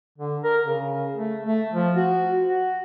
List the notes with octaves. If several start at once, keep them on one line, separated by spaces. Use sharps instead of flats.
D3
A#4
C#3
A3
A3
F3
F#4
F#4